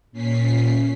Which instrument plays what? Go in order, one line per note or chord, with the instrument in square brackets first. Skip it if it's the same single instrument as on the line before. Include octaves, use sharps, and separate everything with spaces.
[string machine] A#2 C#4 B6 C7